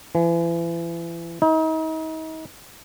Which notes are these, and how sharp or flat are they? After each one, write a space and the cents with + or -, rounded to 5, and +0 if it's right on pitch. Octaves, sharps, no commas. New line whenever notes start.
E3 +35
D#4 +35